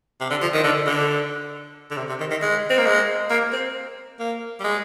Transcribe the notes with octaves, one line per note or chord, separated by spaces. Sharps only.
C3
D3
F3
D#3
D3
D3
D3
C3
C3
D#3
D#3
G#3
C4
A#3
G#3
A#3
C4
A#3
G3
G#3